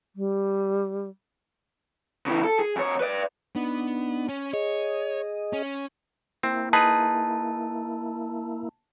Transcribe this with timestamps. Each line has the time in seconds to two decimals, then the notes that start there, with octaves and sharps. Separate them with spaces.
0.16 G3
2.26 C#3 E3
2.44 A4
2.60 G#4
2.76 F2 C#5
3.00 B4 D5
3.56 B3 D4 D#4
4.29 C#4
4.53 G#4 C#5 D#5
5.53 C#4
6.43 A#3 C4 E4
6.73 D#4 G#4 B4 A5